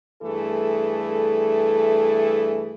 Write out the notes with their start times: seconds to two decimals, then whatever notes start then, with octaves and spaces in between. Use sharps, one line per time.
0.22 G2 E3 A3 G#4 A4